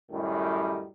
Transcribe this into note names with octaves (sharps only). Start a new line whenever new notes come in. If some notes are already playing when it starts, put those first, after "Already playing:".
F#2 A2 D#3 G3